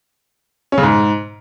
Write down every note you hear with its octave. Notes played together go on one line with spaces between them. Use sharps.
C#4
C#3
G#2